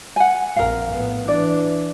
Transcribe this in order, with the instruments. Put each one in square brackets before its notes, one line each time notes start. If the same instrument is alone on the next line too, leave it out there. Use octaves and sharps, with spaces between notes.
[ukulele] F#5 G#5
[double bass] A#1 F2 [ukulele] A#4 F5
[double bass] A2 B3
[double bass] E3 D4 [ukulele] D5